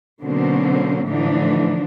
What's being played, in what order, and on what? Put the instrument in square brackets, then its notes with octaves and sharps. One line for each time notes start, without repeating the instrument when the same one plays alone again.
[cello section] B2 D3 F#3 A#3 C4 C#4
A2 D3 E3 F3 D4 D#4